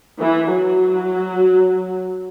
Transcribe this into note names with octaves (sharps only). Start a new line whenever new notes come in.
E3
F#3